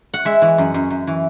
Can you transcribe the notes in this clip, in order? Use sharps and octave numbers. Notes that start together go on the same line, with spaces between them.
F#5
G#3 E5
E3
F#2
F#2
F#2
E3